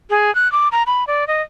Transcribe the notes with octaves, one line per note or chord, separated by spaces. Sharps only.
G#4
F#6
D6
A#5
B5
D5
D#5